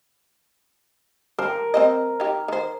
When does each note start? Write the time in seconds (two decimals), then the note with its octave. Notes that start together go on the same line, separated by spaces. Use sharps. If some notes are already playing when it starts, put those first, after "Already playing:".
1.39 A#4 C5
1.74 C4 C5 D#5
2.20 D#4 G4
2.48 D#3 C5